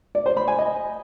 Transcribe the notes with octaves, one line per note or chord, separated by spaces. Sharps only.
D5
C5
B5
G#5
D#5